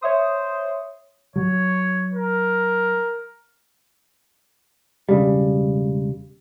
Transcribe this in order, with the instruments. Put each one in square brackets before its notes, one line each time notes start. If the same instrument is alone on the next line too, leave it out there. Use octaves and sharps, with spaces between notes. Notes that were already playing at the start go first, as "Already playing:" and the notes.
[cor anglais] C5 [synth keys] C#5 E5 D#6
[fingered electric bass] F#3 [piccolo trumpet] C#5
[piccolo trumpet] A#4
[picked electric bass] E1 C#3 G3